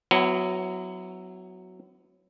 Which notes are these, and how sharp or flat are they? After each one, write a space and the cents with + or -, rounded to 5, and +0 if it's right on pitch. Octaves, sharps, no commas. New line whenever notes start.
F#3 +0 B3 +30 E4 +0